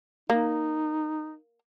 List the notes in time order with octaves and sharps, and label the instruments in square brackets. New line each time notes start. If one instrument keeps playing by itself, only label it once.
[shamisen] A#3 [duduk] D#4